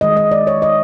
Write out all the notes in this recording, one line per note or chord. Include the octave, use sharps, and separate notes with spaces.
D#3 G#3 D#5
D#5
D5
C#5
D#5